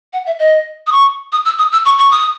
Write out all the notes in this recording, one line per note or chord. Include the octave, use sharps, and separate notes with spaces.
F#5
E5
D#5
D#6
C#6
D#6
E6
D#6
E6
C#6
C#6
D#6